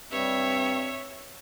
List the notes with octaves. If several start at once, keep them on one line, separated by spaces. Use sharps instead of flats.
G2 G3 C4 C#5 E5